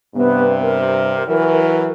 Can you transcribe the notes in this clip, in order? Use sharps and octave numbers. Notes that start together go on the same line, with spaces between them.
G2 C3 B3
A#4
E3 F#3